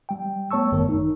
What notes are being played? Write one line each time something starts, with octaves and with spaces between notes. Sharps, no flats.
G3 G5
A3 B3 C#5 A5 C#6 E6
G1 F#2 D#3 A3 A#4 C#5
D#4